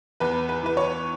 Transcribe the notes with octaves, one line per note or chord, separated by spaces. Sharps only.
E2 B4
B4
E3 B4
C#5